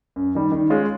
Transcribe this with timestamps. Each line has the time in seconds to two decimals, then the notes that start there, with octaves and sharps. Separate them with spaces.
0.16 F#2
0.35 D#3 G3
0.52 D#3
0.70 G#3 C#4 F4